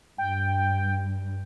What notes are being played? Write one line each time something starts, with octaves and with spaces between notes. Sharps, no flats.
G2 G5